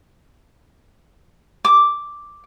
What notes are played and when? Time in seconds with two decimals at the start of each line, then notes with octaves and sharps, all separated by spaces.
1.65 D6